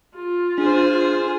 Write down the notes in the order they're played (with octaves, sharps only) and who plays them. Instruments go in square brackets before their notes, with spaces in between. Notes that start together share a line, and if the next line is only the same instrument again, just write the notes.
[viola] F4
[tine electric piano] D4 [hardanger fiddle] G#4 C5